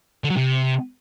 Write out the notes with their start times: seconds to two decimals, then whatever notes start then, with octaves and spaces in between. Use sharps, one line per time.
0.24 D3
0.30 F#3
0.36 C3